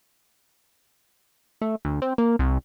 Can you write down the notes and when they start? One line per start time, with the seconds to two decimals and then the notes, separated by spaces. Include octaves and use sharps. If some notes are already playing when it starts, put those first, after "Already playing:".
1.62 A3
1.85 D2
2.02 C4
2.18 A#3
2.39 C2